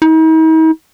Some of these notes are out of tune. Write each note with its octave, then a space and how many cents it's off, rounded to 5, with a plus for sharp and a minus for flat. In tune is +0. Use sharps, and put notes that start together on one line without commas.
D#4 +45